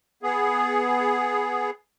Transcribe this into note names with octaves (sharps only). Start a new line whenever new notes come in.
B3 G#4